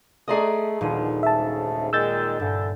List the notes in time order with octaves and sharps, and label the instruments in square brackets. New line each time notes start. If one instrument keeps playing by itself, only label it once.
[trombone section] A3 [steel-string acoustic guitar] G#4 D5 D#5 [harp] A#5 C6 D#6
[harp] D#1 D#4 D#7 [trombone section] B2 D3 F3
[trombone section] D2 G#2 C#3 [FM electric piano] E5 A5
[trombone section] A#2 D#3 G#3 [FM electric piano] E6 G6 A6
[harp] G2 [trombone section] D3 E3